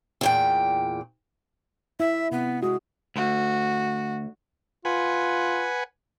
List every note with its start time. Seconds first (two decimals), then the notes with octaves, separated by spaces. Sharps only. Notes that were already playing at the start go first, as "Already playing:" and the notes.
0.21 E2 A#2 G5
2.00 E4 E5
2.32 C3 B3
2.63 G#3 F#4
3.16 D2 F#4
4.85 F4 B4 F#5 G#5